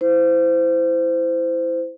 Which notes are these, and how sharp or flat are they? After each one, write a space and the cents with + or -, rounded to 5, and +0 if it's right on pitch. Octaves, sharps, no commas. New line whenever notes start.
E4 +0 C5 -20